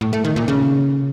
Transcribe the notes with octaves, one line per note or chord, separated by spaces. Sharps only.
A2
A3
D#3
A#2
C#3